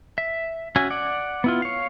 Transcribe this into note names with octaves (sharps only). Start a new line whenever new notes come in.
E5
C#4 F#4 E5 G#5
D5 F#5
B3 E4 F4
C#5 F5